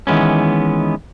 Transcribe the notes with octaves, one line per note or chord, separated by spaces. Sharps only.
D#3 E3 G#3 B3 C#4